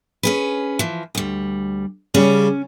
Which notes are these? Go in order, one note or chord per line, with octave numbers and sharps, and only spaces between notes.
C#4 G#4 B4
E3 F3
D2 G3
C#3 G3 C#4